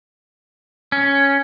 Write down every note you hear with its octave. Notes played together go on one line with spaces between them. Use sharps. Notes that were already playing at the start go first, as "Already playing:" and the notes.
C#4